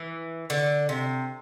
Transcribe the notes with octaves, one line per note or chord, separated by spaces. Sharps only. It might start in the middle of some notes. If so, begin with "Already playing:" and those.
Already playing: E3
D3
C3